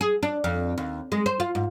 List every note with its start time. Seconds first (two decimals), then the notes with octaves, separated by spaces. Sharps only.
0.01 G#4
0.23 D4
0.44 F2
0.78 D#2
1.12 G#3
1.26 C5
1.40 F4
1.55 G#2